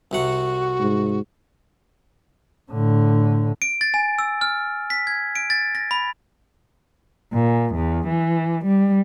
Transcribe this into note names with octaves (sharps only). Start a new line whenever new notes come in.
C2 C3 F#4 F#5
G#2
A2 D3
D7
A6
G#5
E6
F6
B6
G#6
D7
A6
A#6
B5
A#2
E2
E3
G3